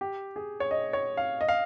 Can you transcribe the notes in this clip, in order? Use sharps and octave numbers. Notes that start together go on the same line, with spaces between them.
G4
G#4
C#5
D#5
C#5
F5
D#5
F5